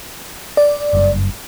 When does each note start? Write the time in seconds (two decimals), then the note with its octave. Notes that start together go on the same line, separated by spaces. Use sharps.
0.57 D5
0.93 F#1 G2